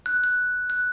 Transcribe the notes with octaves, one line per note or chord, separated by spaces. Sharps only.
F#6
F#6
F#6